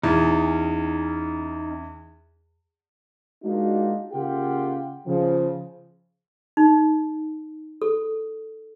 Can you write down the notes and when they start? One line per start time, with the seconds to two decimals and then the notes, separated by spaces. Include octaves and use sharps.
0.03 E2 C#4 D#4
3.44 G#3 A#3 D4 D#4 F4 F#4
4.12 C#3 A#3 F4 G4 F#5 G5
5.07 C#3 F3
6.57 D#4
7.82 A4